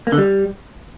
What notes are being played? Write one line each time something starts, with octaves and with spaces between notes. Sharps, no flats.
A#3
D3
G3